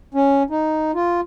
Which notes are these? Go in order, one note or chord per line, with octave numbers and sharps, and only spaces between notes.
C#4
D#4
F4